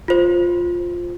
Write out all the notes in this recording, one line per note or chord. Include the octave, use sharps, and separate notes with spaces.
F4 C5